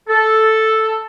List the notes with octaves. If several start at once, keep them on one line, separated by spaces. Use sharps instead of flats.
A4